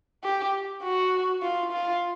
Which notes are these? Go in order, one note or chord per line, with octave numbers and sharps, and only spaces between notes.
G4
F#4
F4
F4